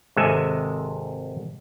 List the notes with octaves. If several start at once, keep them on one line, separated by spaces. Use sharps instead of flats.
G#1 C3 G#3 A4 E5 G#5